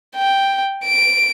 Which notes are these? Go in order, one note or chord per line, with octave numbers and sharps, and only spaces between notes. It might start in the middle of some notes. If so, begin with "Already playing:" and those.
G5
D7